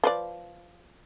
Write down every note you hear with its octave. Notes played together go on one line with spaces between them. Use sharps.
F3 B4 D5